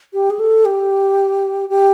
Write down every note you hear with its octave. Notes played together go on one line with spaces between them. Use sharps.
G4
G#4
A4
G4
G4